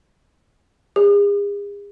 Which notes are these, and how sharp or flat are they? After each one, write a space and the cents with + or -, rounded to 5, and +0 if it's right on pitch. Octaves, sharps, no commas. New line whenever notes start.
G#4 -40